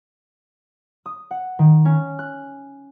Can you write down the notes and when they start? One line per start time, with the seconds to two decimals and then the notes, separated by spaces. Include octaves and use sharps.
1.06 D#6
1.31 F#5
1.59 D#3
1.85 C#4
2.19 F#6